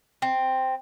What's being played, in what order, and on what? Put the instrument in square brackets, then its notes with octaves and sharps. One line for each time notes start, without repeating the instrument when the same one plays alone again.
[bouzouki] C4